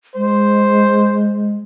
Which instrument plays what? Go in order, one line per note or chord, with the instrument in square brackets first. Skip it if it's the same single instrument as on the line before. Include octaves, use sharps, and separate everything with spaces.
[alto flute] G#3 [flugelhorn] C5